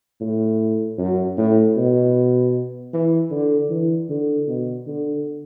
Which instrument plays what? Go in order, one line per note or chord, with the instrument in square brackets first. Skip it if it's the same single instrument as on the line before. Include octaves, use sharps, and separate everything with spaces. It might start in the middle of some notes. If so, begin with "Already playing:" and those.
[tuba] A2
F#2
A2
B2
E3
D3
E3
D3
B2
D3